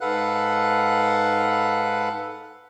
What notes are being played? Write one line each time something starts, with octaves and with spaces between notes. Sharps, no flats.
G#2 A4 B4 F5 F#5 F#6